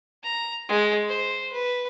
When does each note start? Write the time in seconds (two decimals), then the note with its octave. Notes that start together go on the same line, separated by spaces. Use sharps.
0.24 A#5
0.69 G#3
1.08 C5
1.52 B4